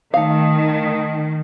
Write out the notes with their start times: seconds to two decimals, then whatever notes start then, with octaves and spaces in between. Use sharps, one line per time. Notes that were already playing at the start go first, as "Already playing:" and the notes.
0.14 D#3 A3 F5 D#6